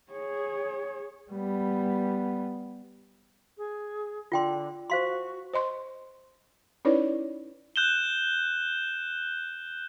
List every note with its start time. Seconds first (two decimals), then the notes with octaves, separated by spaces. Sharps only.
0.13 G#4 C#5
1.31 G3 B3
3.58 G#4
4.32 D3 F4 G5 C6
4.90 F#4 C5 F5 C6
5.54 C5 D#5 C6 C#6
6.85 C#4 D#4 E4 B4 C#5 D5
7.76 F#6 G6 E7 G7